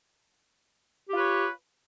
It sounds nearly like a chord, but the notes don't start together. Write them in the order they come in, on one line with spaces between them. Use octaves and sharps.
G4 F4 B4 C#5